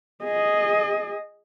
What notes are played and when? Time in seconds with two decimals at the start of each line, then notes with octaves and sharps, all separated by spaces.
0.24 G#4 D#5